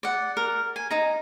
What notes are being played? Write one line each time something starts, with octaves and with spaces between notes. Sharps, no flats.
D5 F#5
A#4
G#5
D#4 A#5